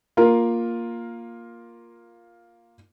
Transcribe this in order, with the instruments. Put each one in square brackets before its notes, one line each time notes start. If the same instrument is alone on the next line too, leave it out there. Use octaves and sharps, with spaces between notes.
[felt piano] A#3 F4 A#4